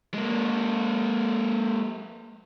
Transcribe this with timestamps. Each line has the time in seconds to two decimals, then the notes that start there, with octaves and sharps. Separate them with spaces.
0.14 G#3 A#3